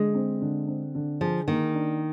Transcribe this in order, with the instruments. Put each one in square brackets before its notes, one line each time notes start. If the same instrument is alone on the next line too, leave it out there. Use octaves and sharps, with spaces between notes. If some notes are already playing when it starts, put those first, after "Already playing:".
Already playing: [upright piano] D3 [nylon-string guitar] G#3
[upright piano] C4
D3
C4
D3
[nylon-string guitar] F3 [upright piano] G#4
[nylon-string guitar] D#3 [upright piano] A#3
[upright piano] D4